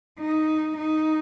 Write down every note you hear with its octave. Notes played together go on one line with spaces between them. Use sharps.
D#4
D#4